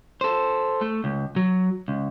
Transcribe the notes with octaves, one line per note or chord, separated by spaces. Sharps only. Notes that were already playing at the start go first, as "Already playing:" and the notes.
A4 C5
A3
C#2
F#3
C#2